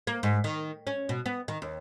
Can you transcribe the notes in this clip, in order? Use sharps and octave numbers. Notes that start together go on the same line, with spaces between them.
A#3
G#2
D#3
C#4
B2
B3
D#3
D#2